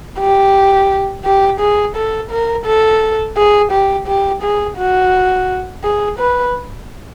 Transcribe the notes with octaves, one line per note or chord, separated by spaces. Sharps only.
G4
G4
G#4
A4
A#4
A4
G#4
G4
G4
G#4
F#4
G#4
B4